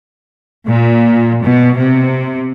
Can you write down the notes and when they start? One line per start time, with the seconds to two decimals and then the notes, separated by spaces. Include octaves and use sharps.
0.66 A#2
1.43 B2
1.77 C3